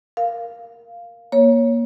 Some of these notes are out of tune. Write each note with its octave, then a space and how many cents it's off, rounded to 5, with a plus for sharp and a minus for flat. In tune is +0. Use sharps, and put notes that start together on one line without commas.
A#4 +0 F5 +0
A#3 +20 C#5 +0